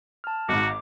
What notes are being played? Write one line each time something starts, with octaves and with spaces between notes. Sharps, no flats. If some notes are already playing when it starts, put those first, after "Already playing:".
A5 F6
G#1 G#2 F#4 D6